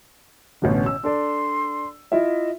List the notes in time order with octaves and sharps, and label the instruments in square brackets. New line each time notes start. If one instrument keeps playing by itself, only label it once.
[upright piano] A1 B2 D3 [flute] C#4
[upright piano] E6
[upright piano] D4 A4 D5 [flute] C6
[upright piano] E4 F4 E5 [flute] D#5